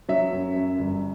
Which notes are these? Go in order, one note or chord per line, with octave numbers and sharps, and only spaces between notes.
F#3 E5
F#2
F#2
G1